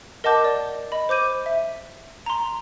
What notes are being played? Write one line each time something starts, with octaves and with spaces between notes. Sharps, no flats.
A#4 D#5 F#5 A5 D6 G6
D5
D#5 B5
C5 D6 G6 D#7
E5
A#5 C6